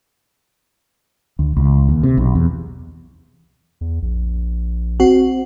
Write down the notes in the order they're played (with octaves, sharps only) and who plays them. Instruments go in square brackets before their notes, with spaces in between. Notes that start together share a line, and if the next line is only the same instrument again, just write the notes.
[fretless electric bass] D2
C#2
D#2
C3
B1
E2
[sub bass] E2
A#1
[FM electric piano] C4 F#4